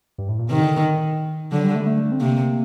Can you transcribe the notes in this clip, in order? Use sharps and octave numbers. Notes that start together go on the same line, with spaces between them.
G2
A2
A#2
C3 D#3
D3
D3 F#3
G3
A3
G3
A3
C4
C3 A#3